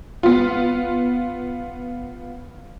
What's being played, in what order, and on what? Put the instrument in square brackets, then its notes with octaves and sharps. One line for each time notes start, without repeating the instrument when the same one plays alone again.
[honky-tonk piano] B3 F4